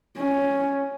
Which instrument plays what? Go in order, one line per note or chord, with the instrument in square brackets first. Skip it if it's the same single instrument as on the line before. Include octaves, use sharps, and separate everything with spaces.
[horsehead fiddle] C#4